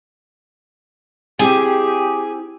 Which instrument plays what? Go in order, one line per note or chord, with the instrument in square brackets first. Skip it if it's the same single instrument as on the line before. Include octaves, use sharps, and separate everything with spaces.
[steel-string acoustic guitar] C4 E4 G#5 [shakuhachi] G4 [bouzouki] G#4